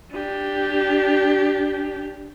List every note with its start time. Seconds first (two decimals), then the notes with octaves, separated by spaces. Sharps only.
0.13 D4 G4